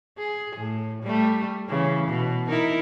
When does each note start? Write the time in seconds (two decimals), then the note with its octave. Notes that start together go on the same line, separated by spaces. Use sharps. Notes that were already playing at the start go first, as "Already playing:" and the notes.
0.18 G#4
0.56 A2
1.03 G3 A3
1.69 C#3 E3
2.09 B2
2.49 D#4 E4 A#4